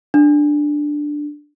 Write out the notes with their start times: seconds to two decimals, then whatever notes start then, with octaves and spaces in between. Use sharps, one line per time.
0.14 D4